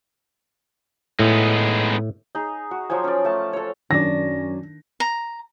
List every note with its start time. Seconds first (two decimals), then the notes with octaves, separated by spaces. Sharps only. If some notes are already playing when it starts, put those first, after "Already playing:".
1.19 A2 G#3 B3 D#4
2.35 D#4 G#4
2.71 F#4
2.90 F3 F#3 C5 G#5
3.04 C#4 D5
3.25 A3 A5
3.53 A4 C#5
3.91 F#2 D#3 F#3 C#4 D4 D5 A#6
5.00 A#5